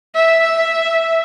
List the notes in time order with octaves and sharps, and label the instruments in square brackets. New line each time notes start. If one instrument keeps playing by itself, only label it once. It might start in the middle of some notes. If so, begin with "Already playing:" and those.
[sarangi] E5